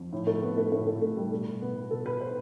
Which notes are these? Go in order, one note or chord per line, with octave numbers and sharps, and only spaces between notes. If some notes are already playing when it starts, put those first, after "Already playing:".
Already playing: F2
A2
A3
A2 B3
A3
A2 A3
A3
A2 A3
G3
B2 A3
B2 B3
B2 A4
B4
C5